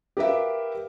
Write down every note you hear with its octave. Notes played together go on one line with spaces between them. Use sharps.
G4 A#4 B4 E5 F5